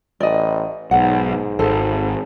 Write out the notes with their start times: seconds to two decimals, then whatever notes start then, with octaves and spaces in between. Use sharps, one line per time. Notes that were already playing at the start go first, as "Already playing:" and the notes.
0.20 A1 D5 D#5
0.91 B1 G#2 F#5
1.59 G#1 A4 C5